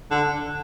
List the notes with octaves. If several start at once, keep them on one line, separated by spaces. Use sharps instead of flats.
D3